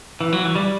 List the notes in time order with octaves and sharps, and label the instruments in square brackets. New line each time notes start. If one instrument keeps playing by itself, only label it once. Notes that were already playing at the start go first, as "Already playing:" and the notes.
[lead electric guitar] E3
F#3
E3
G3